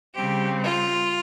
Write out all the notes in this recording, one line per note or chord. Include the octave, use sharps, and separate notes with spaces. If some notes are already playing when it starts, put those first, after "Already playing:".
C#3 G3 C4 G4
F4